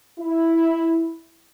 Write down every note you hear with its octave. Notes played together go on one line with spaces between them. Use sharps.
E4